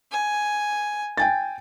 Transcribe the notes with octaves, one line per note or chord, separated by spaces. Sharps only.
G#5
G5 G#5 A6